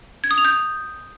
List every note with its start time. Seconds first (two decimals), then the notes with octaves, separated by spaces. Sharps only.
0.24 G#6
0.31 D#6
0.38 F7
0.45 G6